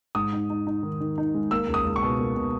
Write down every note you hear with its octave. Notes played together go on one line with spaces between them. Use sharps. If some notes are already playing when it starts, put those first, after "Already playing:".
G#2 D#6
D#4
D#4
D#4
D#3
D#3
D#4
G#3
A#3 E6
C#2
D#6
C#2
C#6
B2
A#3
B2